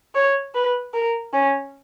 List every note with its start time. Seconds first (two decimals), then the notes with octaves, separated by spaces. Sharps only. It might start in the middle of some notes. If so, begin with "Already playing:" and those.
0.15 C#5
0.55 B4
0.94 A#4
1.33 C#4